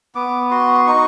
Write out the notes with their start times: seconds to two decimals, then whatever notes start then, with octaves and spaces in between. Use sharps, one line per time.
0.15 B3 D6
0.51 F#4 C6
0.74 C6
0.86 D#4 C#6